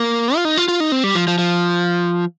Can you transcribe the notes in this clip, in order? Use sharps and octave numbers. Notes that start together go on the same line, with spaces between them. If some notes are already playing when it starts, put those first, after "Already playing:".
Already playing: A#3
F4
D#4
F4
F4
D#4
C4
G3
F3
F3
F3